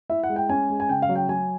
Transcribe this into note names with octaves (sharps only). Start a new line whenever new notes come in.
E4 E5
F#5
G#3
G5
C#4 G#5
G#3
G#5
C#3 G5
F5
F#3
G5
F#3 G#5